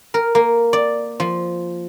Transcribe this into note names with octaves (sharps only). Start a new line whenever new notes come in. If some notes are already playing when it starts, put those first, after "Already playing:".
A#4
A#3
D5
F3